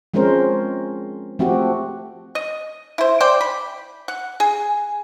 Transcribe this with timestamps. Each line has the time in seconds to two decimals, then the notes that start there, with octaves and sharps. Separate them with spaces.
0.14 F3 G#3 C4 C#4 A#4 C5
1.39 F3 A3 C4 F#4 G4
2.35 D#5
2.98 E4 C5
3.21 C5 D5 G5
3.41 B5
4.08 F#5
4.40 G#4